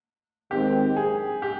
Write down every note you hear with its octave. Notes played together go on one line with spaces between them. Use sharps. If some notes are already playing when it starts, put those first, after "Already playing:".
D#2 D#3 G#3 C4 G4
G#4
G4